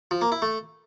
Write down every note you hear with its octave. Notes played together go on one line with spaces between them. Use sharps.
F3
A#3
E4
A3